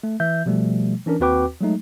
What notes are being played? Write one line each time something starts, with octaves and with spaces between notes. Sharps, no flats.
A3
E3 E5 G6
B2 F3 G3 A3
E3 C#4 D4 A#4
D#2 C4 F#4 B4 G5 D6
F#3 G#3 A3 D#4